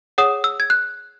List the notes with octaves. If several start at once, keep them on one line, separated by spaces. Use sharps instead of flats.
G#4 C#5 F#5 D#6
E6
G#6
F#6